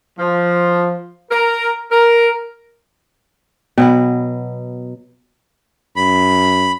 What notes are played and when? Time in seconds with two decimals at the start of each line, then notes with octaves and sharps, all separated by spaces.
0.19 F3
1.31 A#4
1.92 A#4
3.78 B2 F#3 B3 B4
5.96 F#2 B5